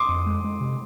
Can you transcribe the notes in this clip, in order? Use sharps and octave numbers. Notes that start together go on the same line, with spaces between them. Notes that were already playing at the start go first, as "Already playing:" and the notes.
Already playing: C6 D6 D#6
F2
G#3
G#3
C3